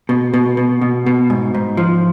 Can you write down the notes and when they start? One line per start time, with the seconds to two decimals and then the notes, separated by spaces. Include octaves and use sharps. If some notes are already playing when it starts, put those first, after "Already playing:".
0.09 B2
0.34 B2
0.57 B2
0.82 B2
1.06 B2
1.30 G#2
1.54 G#2
1.77 F3